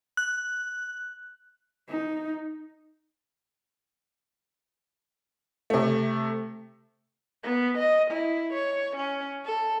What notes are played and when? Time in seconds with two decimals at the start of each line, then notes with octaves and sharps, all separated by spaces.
0.17 F#6
1.89 D#4
5.70 C3 A3
7.43 B3
7.78 D#5
8.11 E4
8.54 C#5
8.96 C#4
9.45 A4